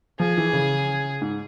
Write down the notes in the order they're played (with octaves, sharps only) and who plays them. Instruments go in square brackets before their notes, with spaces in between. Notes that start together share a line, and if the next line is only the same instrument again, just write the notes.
[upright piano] F3 [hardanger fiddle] G#4
[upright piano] E3
C#3
G#2